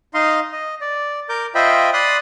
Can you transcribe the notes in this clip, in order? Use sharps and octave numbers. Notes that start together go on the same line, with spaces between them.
D#4 D#5 F5 C6
D#5
D5
A#4 D6 G6
F4 C5 D#5 E5 G5 B5
D5 B5 C6 D#6 F#6